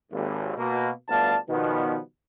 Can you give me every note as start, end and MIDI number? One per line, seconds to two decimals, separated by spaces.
0.11 0.52 32
0.11 0.52 39
0.57 0.90 47
0.57 0.90 58
1.09 1.35 31
1.09 1.35 38
1.09 1.35 59
1.09 1.35 74
1.09 1.35 77
1.09 1.35 81
1.49 1.98 47
1.49 1.98 51
1.49 1.98 53
1.49 1.98 55
1.49 1.98 59